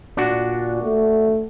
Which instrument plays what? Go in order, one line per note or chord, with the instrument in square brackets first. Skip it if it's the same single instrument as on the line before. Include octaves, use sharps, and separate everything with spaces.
[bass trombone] A#2 [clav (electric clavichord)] D4 F#4
[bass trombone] A3